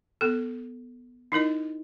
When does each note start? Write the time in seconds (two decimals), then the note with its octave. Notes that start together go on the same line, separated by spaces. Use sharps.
0.21 B3 A4
1.32 D#4 E4 A#4 D#5